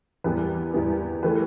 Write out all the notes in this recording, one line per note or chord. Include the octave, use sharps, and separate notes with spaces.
E2 E3 G3 B3 G4 B4
E2 E3 G3 B3
E3 A3 G4 B4